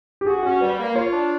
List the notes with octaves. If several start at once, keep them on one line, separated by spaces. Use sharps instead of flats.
G4
F#4 G#4
C#4 F#4
G3 B4
A#3
F4 C#5
D4